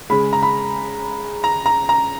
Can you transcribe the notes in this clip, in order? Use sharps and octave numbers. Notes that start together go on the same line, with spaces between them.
C#3 G#3 B5
A#5
B5
A#5
A#5
A#5